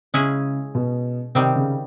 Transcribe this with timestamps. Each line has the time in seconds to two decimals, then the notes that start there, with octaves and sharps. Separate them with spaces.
0.14 C#3 G#3 C#4 E4 G#4
0.75 B2
1.35 C3 D#3 G3 C4
1.56 C#3